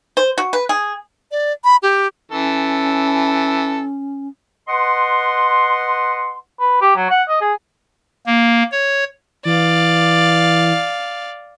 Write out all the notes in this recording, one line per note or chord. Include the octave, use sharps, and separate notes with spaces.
C5
F#4
B4
G#4
D5
B5
G4
E3 C#4 A4
B4 D#5 F#5 C6
B4
G4
F#3
F#5
D#5
G#4
A#3
C#5
E3 D5 F5